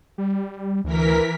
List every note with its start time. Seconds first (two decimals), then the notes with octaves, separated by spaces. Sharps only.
0.18 G3
0.84 D2 E3 A#4 B6